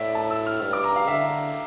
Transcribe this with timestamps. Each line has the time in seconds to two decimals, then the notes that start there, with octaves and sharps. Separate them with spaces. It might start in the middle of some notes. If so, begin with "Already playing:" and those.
Already playing: A2 D5 E5
0.15 A5
0.30 E6
0.46 F6
0.61 G2
0.73 D6
0.84 A#5
0.96 F5
1.07 D3 E5